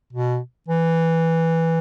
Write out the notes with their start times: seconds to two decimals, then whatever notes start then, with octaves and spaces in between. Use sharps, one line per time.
0.13 B2
0.68 E3